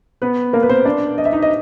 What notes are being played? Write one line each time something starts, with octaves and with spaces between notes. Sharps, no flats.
B3 B4
A#3 A#4
B4
C4 C5
D4 D5
D#5
E5
D#4 D#5
D#5